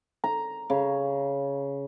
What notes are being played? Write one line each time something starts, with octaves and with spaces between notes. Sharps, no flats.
A#5
C#3